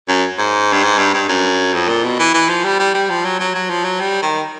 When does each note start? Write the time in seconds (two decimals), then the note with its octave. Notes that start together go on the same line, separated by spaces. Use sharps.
0.08 F#2
0.38 G#2
0.72 G2
0.84 G#2
0.98 G2
1.14 G2
1.29 F#2
1.74 F2
1.88 A#2
2.04 B2
2.19 E3
2.34 E3
2.49 F3
2.64 G3
2.79 G3
2.94 G3
3.10 F3
3.25 F#3
3.40 F#3
3.54 F#3
3.70 F3
3.84 F#3
4.00 G3
4.22 D#3